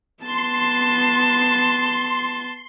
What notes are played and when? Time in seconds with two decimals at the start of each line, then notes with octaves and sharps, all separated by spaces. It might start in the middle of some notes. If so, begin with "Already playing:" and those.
0.23 B3 A5 C6